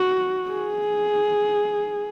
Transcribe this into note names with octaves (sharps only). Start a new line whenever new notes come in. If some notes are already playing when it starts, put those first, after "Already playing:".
Already playing: F#4
G#4